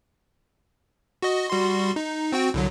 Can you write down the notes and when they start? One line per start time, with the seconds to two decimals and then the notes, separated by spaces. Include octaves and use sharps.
1.22 F#4 D#5
1.50 G3 F#4 C6
1.96 D#4
2.32 C4 F#4 G5
2.54 C2 D3 F#3